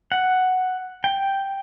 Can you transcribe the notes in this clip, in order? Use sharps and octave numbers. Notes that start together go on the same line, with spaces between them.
F#5
G5